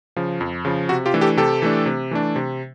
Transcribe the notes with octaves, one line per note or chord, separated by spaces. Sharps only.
C#3 F3
F2
C#3 F3
C3 F#4
F4 G4
E3 A3 D4
G4 A4
C3 G4 A4
E3 A3 D4
C3
E3 A3 D4
C3